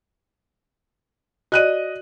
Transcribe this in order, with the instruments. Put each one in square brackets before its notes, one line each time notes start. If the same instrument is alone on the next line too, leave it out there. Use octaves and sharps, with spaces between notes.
[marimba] F#4 D5 [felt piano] D#5 F#6 D#7